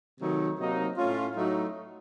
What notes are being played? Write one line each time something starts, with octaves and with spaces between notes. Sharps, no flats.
C3 D#3 F#3 A3 D#4
C3 F#3 A#3 D#4
A2 A3 C#4 F4
A2 F#3 A3 D#4